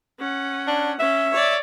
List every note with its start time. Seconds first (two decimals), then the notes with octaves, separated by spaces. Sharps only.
0.19 C#4 F#5
0.67 D4
1.00 C#4 E5
1.31 C#5 D5